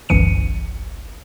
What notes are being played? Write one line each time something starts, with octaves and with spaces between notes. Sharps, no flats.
G1 C2 F#2 E3 C#7 D#7